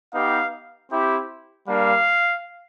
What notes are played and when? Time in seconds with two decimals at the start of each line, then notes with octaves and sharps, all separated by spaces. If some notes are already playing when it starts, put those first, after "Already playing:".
0.13 B3 D#4 G4 F5
0.91 C4 E4 G4
1.67 G3 A#3 D4 F5